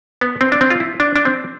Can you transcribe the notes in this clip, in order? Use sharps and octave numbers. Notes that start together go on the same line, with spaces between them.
B3
C4
D4
C4
F4
E4
D4
D4
C4